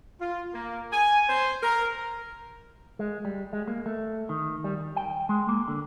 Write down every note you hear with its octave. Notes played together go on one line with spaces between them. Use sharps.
F4
A#3
G#5
C5
A#4
G#3
G3
G#3
A#3
A3
D#3
G3
D#3
G5
G#3
A#3
D3